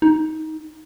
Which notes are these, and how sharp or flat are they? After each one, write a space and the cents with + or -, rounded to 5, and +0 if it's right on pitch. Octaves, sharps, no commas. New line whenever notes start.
D#4 +15